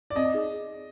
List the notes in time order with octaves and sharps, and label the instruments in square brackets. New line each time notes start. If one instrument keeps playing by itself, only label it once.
[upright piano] D5
[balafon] C4 [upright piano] D#5
[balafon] D#4 G#4